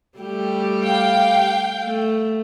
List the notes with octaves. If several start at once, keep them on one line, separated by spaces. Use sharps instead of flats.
G3 A3 G4
F5 G5
A3